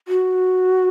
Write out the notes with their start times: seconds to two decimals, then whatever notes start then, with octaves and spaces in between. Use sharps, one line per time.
0.08 F#4